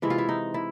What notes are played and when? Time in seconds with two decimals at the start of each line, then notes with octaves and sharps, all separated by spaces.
0.02 C3 E3 G#3 E4
0.10 F4
0.18 E4
0.29 D#4
0.54 E4